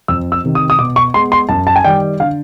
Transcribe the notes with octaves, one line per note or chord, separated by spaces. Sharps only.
F2 E6
E6
C3 D#3
D#6
D#6
B2 D6
C#6
G#3 B3 C6
C6
F#2 A5
A5
G#5
D#3 G3 G5
D3 F5